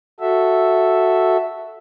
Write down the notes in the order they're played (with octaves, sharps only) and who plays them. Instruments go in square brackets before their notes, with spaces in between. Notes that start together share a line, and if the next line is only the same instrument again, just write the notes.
[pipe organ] F#4 A4 E5